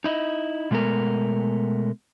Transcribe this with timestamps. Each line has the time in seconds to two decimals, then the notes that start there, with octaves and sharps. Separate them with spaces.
0.04 D#4 E4 D#5
0.71 B2 G#3 A3 B3 A#4